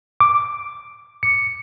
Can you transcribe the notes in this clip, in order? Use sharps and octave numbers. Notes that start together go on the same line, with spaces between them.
D6
C#7